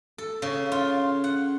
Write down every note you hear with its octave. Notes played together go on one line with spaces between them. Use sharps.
A4
C#3
F4
F#5